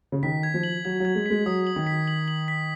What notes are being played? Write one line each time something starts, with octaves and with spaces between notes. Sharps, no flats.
C#3
D#3 B6
G#6
F3
F#7
F#3 G#6
F#3 G#6
G#3
G#3 B6
F#3 D#6
F#7
D#3
B6
F#7
F#7
B6